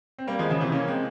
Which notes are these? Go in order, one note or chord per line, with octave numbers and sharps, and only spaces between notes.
C4
G3 A#3
F3 G#3
C#3 F3
C3 E3
A#3 C#4
G#3 C4